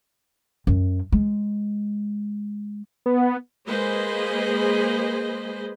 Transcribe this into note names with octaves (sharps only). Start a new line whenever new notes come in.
F#2
G#3
B3
G#3 A#3 G#4 B4 C5 D#5